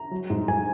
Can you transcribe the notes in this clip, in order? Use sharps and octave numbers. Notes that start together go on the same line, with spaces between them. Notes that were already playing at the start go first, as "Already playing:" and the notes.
Already playing: A#5
F#3
G#2
G#2 G#5